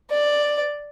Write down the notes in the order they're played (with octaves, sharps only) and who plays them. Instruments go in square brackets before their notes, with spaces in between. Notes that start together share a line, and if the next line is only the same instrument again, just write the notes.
[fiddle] D5